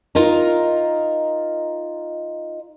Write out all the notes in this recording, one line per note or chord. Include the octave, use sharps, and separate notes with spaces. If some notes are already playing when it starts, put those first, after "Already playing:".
D#4 F4 A#4 D#5 A#5